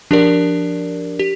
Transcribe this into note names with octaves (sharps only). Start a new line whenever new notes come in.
F3 D4 G4 A#4 D5
G4